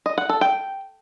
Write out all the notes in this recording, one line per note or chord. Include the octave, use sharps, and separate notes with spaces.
D#5
F#5
A4
G5